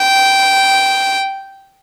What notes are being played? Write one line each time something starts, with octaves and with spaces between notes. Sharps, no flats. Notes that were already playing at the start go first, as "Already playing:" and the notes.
Already playing: G5